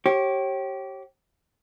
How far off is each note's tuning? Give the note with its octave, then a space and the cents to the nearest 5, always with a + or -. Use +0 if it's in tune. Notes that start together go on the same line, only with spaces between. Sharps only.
G4 -25 C#5 -35